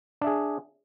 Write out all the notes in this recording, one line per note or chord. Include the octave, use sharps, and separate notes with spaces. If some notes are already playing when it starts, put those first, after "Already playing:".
D4 G#4 E5